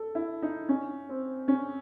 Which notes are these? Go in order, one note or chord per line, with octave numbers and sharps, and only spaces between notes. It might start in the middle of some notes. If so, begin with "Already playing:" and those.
Already playing: A4
E4
D#4
C#4
C4
C#4